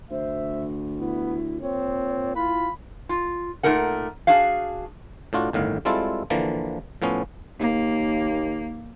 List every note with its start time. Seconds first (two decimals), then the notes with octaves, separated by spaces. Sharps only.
0.11 D2 C5 E5
0.99 B3 E4
1.62 A#2 C4 C#5
2.36 E4 F4 B5
3.09 F4
3.63 A#2 G#3 A3 D#4 A#4 F#5
4.27 D4 F#4 G#4 F5
5.33 A2 D4 F4 F#4
5.53 G1 A2 D#3 F5
5.85 G3 G#3 C4 E4 F4 A4
6.30 D3 E3 F3 A#3
7.02 A2 F3 B3 C#4
7.60 D#2 A#3